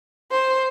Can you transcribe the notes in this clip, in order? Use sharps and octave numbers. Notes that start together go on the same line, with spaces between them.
C5